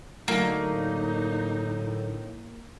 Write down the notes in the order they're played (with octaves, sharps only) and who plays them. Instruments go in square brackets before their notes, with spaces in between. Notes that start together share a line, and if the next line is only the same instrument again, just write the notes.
[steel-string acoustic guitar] D3 F#3 A3 [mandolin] A#3 [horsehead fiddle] D#4
[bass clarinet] A2